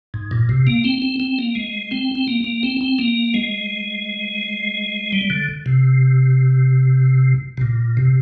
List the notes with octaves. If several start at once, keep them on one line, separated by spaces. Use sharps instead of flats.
G#2
A#2
C3
A#3
C4
C4
C4
A#3
G#3
C4
C4
A#3
A#3
C4
C4
A#3
G#3
G3
D3
C3
C3
A#2
C3